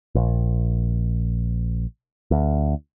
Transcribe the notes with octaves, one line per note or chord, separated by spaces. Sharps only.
A#1
D2